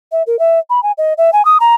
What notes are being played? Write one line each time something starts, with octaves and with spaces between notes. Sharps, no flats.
E5
A#4
E5
B5
G#5
D#5
E5
G#5
D#6
A#5